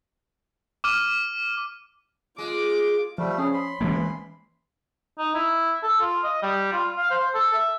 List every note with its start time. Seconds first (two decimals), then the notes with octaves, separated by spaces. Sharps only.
0.84 D6 F6 D#7
2.38 G#3 F4 D6
3.18 F3 G3 A3
3.38 C#4 G#4
3.53 B5 C6
3.81 E3 G#3 A#3
5.19 D#4
5.35 E4
5.83 A4
6.01 F4
6.24 D#5
6.43 G3
6.73 F4
6.97 F5
7.11 C5
7.35 A4
7.54 E5